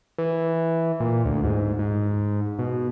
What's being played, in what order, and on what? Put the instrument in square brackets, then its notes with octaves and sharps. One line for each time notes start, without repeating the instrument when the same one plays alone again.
[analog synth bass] E3
A#2
D2
G#2
G#2
B2